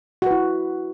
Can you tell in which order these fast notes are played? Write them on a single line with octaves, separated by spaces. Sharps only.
F#4 B4 E4